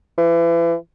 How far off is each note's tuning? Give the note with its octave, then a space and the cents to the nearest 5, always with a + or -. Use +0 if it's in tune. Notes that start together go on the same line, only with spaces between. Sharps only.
E3 +35